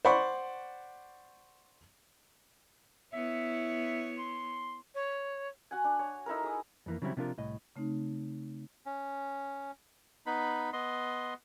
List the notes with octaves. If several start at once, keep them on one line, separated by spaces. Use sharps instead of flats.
C5 D5 F#5 B5 C#6
B3 E4 C#5 E5
C6
C#5
F#4 F#5 G#5
D4
C#5
D#4 E4 A4 A#4
G#4 D#6
F2 E3 A#3
C#3 E3 F#3 G3 C4 E4
C3 F3 D4 F4 A#4
C2 A2 D#5
C#3 A3 C4 D#4
C#4
B3 D#4 B5
B3 D#5 C6